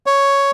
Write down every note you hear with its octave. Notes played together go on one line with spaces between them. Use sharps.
C#5